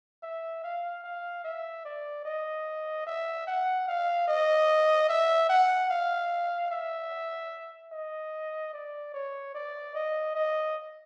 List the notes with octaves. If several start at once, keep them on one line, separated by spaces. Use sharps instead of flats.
E5
F5
F5
E5
D5
D#5
E5
F#5
F5
D#5
E5
F#5
F5
E5
D#5
D5
C#5
D5
D#5
D#5